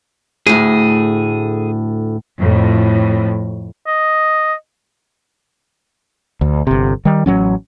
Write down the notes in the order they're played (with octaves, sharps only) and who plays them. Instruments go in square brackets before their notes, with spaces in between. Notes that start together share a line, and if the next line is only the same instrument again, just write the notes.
[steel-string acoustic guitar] D2 A2 [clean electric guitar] G#4
[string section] F2 A2
[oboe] D#5
[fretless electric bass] D2
G1 C3
D#3 G3
A1 F3 F#3 C#4